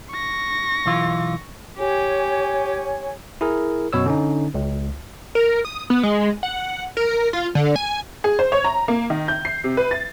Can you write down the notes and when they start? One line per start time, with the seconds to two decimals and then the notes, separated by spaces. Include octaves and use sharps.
0.11 C#6 A#6
0.86 B1 E3 F4
1.78 G4 C#5 G#5
3.41 E4 G#4 A#4
3.93 F#2 B2 C#5 E6
4.06 D3 C#4 D#4
4.54 C#2
5.35 A#4
5.65 D#6
5.90 B3
6.03 G#3
6.43 F#5
6.97 A#4
7.33 F4
7.55 D3
7.76 G#5
8.24 G#4
8.39 C5
8.52 C#5
8.64 A#5
8.88 A#3
9.10 D#3
9.28 G6
9.45 C7
9.64 C3
9.77 B4
9.91 A6